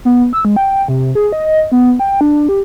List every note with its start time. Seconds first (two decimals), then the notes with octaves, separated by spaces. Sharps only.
0.05 B3
0.33 E6
0.45 G#3
0.56 G5
0.88 C3
1.15 G#4
1.32 D#5
1.72 B3
2.00 G5
2.21 D4
2.49 G4